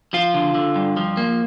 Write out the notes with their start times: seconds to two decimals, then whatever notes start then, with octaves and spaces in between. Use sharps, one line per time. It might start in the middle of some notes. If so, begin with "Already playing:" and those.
0.13 F3 F4
0.34 D3
0.55 D3
0.76 G2
0.97 F3
1.17 A#3